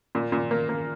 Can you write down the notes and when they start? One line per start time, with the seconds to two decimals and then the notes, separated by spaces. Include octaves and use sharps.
0.15 A#2
0.32 A#2
0.51 A#3
0.69 A#3